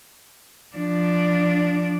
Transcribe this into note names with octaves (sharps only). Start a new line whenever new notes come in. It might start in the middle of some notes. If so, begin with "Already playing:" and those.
F3 D4